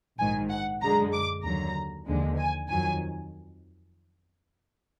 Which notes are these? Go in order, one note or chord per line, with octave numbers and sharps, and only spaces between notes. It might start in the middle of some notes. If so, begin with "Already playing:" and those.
A#1 G#2 D#3 G#5
F#5
F#2 D3 G#3 A#5
D6
D#2 D3 F#3 A#5
D#2 D3 F3 G#3
G#5
F2 D#3 F#3 G#5